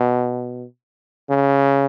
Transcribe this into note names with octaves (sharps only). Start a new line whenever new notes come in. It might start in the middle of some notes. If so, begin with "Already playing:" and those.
Already playing: B2
C#3